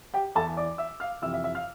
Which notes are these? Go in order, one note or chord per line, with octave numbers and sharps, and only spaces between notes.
G4 G5
E2 E3 A4 A5
D5 D6
E5 E6
F5 F6
F2 C3 E3 E5 E6
E5 E6
E5 E6
F5 F6